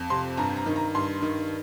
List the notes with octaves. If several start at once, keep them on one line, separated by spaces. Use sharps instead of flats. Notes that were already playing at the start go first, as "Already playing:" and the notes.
Already playing: F2
C3 C6
G2 A#5
A#5
D#3
A#5
G2 C6
D#3